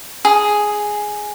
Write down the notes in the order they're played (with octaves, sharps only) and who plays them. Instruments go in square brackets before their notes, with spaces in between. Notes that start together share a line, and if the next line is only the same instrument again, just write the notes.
[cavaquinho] G#4